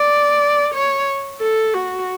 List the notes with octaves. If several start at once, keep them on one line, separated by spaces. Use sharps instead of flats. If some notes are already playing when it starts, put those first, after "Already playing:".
Already playing: D5
C#5
A4
F#4